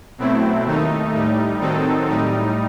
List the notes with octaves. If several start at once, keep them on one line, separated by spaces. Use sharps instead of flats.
B2 F#3 A3 C4 E4
D#2 D#3 A3 D#4
A2 G3 D#4
D#3 F#3 C4 D#4 A4
A2 G3 D#4